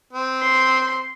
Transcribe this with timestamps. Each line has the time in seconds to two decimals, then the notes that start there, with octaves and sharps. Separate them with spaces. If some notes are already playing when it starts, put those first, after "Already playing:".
0.13 C4
0.42 C6